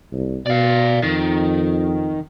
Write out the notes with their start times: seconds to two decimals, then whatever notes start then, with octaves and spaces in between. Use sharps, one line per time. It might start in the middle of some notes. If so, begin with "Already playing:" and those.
0.13 C2
0.46 B2 D5 F5
1.03 F2 D#3